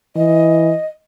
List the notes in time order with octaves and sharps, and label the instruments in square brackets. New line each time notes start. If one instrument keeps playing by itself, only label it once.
[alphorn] E3 [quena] D#5